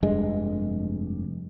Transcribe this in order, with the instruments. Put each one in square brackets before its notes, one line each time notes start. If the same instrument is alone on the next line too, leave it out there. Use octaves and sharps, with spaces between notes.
[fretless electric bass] F1 G2 G#3